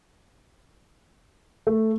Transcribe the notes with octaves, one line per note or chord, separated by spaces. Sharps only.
A3